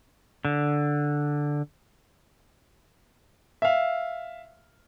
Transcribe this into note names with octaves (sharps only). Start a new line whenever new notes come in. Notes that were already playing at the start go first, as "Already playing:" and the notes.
D3
E5 F5